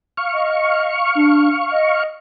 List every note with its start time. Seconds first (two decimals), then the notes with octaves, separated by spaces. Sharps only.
0.17 F5 C#6
0.33 D#5
1.15 D4
1.71 D#5